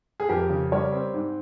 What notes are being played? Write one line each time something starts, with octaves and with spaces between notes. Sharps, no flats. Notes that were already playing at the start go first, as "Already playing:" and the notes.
G#4
F2 G4 A#4
C#3
G3 A#4 C#5
C4
G#2